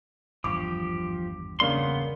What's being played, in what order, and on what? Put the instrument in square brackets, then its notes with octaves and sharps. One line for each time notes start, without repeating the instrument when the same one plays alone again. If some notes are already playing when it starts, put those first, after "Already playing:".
[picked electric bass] G#1 E2 G2 [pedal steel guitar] F3 G4 [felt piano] D6
[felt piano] C#3 A#3 D4 [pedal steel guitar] B3 C6